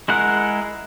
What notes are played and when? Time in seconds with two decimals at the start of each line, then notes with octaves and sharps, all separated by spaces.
0.08 G#3 E4 G#4 A#4 F#5